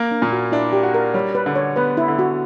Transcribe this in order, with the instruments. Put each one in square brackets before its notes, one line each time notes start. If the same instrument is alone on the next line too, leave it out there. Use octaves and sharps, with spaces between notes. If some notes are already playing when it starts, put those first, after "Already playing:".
Already playing: [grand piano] A#3 A#4
[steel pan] D4
[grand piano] A#2
[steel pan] F#4
[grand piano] D4 [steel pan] E4
[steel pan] G4
[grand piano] F#4
[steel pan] A#4
[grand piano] G3 [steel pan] C#5
[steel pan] B4
[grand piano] D3
[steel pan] C#5
[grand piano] B3 [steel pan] B4
[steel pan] E4
[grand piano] D3
[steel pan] F#4